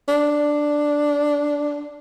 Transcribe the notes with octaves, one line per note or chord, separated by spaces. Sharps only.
D4